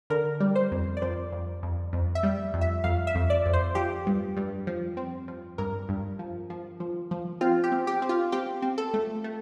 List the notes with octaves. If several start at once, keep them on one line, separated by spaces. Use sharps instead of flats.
D3 A#4
G3
C5
F2
D5
F2 C5
F2
F2
F2
E5
G3
F2
E5
F2 F5
E5
F2
D5
F2
C5
F3 G4
G2
G2
F3
C4
F3
G2 A#4
G2
F3
F3
F3
F3
C4 F4
G4
C4
G4
C4
F4
C4 G4
C4
A4
A3
A3